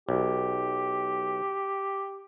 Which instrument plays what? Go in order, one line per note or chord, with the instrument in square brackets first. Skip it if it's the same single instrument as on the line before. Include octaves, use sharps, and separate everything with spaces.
[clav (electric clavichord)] B1 [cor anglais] G4